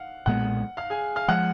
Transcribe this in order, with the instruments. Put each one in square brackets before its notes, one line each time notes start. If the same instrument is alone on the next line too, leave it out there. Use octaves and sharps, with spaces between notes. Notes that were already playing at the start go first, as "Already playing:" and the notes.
Already playing: [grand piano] F5 F#5 F6
[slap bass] B1 A#2 G#3 B3 [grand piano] F#5 F#6
[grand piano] F5 F6
G#4 G#5
F5 F6
[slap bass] F3 G#3 [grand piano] F#5 F#6